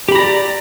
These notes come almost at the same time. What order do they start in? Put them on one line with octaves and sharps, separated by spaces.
G4 B5 A#5 D5